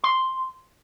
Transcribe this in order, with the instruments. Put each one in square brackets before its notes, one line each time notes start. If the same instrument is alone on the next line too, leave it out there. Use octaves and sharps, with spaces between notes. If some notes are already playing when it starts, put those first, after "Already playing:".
[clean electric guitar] C6